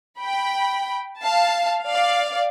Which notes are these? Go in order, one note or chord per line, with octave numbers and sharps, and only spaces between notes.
G5 B5
F5 A5
D5 F5